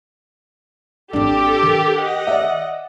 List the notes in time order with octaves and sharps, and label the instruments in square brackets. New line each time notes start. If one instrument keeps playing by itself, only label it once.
[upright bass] G#1 E4 [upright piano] D4 [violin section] G4 [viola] A4
[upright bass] D#3
[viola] D#5 F#5
[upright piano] D5 E5